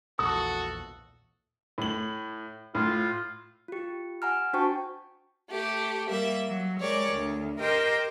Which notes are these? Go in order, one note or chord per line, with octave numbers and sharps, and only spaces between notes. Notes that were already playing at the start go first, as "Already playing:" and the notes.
A#1 E2 F#4 A4 D#6
A2 F#7
A2 F4
F4 G4
F#5 G#5 A#5 F6
D4 F#4 C5 G5 A5 C#6
A3 G4
G3 A#3 E5
F#3
G#3 G4 A#4 C#5 D5
D2
G4 A#4 C5 D#5 G5